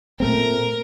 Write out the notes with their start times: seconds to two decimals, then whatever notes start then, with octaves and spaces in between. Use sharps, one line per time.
0.19 A#2 A3 C4 A#4